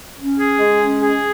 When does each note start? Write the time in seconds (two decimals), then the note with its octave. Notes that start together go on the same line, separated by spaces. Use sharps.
0.18 C#4
0.39 G#4
0.60 G#3
0.80 C#4
1.01 G#4